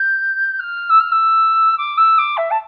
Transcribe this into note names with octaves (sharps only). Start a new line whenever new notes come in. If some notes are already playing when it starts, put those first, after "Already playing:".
Already playing: G6
F6
E6
F6
E6
D6
E6
D6
E5
A5